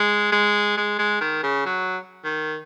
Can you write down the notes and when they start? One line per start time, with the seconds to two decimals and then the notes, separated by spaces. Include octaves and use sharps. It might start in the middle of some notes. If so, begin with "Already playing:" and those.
Already playing: G#3
0.32 G#3
0.77 G#3
0.99 G#3
1.21 D#3
1.43 C#3
1.66 F#3
2.25 D#3